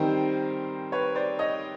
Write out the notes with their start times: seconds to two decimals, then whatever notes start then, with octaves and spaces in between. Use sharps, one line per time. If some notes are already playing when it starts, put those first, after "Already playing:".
Already playing: D#3 G3 C4 D#4 A#4 C5
0.92 B4 C#5
1.15 C5 D5
1.39 C#5 D#5